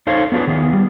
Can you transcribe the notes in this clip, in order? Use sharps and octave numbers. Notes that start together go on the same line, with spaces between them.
D#4 A4 C5 C#5 F5
B3 D4 F4 G#4 B4
D#3 B3 G#4
G3